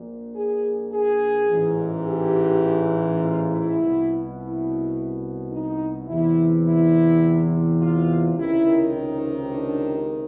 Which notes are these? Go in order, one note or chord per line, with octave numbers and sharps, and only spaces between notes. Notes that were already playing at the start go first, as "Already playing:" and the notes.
Already playing: A#1 A#2
G#4
G#4
A1 G#2 E3
G4
F4
E4
C2 B2
E4
D#4
E2 C3 E3 E4
E4
F4
C#2 C3 D#3 E4
D#4
D4